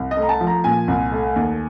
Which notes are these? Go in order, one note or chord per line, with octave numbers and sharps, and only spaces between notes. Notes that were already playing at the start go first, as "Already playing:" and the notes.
Already playing: C2
D#5
A3
A#5
A5
F3
A#5
A#2 G#5
C2
A3
D#2